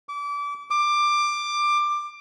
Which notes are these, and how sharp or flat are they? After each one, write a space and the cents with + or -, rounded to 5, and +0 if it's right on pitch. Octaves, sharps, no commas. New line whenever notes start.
D6 -30
D6 +15